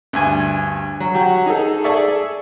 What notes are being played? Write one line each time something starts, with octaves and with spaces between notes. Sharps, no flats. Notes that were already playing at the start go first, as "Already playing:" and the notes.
D2 G2 G#5
F#3
F#3 F#4 G4
D#4 G#4 A4
G#4 A4 D5 E5 C#6